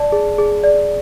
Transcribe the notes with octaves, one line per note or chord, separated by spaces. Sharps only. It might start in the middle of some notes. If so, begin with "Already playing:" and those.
Already playing: D5 A5
G#4
G#4
D5